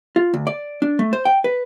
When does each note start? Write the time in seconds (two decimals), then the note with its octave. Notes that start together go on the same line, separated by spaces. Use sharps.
0.16 F4
0.34 D2
0.47 D5
0.82 D4
0.99 A3
1.13 C5
1.25 G5
1.44 B4